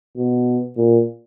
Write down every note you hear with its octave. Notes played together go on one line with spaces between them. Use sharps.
B2
A#2